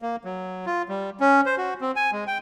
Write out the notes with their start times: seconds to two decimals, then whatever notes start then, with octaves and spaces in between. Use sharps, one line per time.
0.02 A#3
0.25 F#3
0.66 F4
0.89 G3
1.20 C#4
1.46 C5
1.58 F#4
1.81 C4
1.96 G#5
2.12 G#3
2.27 G5